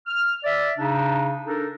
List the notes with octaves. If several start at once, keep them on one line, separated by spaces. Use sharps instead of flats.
F6
D5 E5
C#3 D4 D#4
D4 D#4 A4 A#4